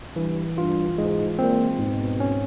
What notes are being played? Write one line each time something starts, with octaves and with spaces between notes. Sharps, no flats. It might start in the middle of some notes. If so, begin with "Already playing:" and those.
G2 E3
G2 F4
G#2 G#3
A#2 C4
G#2 B2
C#4